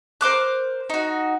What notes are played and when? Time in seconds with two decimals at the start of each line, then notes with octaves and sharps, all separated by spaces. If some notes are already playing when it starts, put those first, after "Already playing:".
0.21 A#4 C5 D6 F#6
0.90 D#4 F#4